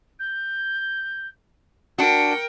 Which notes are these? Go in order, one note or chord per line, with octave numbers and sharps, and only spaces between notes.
G6
D4 F#4 A#4 G5 C#7